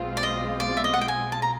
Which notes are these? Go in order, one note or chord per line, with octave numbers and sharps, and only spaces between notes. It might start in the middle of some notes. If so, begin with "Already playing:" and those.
Already playing: B1 B2 G#3 C4 F4
D5
D#5
D5
E5
D#5
F#5
G5
G#5
A5
A#5